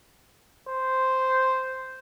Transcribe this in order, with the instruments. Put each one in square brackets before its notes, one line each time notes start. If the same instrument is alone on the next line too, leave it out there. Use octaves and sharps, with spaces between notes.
[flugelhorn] C5